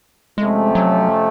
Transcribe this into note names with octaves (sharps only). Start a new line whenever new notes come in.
F2 C3 F3 G#3 A3 C#4
F#3